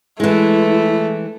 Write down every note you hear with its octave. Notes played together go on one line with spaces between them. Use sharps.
E3 G#3 A3 E4